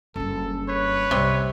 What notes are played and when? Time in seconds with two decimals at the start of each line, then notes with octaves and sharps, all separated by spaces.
0.16 F#1 G2 A4
0.69 B4 C#5
1.11 C2 C3